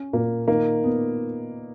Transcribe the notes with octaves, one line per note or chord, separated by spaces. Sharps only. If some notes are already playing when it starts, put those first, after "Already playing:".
Already playing: C#4
A#2 A#3
D#3 A#3
B3